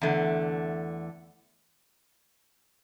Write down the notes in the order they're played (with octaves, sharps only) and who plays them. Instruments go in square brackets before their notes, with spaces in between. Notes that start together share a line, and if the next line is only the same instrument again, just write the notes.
[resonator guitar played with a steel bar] E2 D3 A3